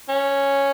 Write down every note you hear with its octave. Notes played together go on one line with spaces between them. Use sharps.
C#4